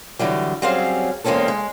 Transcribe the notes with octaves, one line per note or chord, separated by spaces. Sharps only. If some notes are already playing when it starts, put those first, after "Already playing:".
D3 E3 F#3 G3
F#3 G3 C4 C#4 G#4 F5
E2 G#3 A#3 C4 C#4 A4
G#3